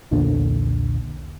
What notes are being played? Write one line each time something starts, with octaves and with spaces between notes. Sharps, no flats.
B1 E2 A#2 D3